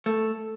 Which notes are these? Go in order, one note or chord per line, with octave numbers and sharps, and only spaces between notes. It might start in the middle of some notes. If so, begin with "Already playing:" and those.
A3